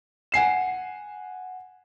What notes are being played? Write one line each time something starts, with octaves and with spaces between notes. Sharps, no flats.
F#5 G#5 C7 E7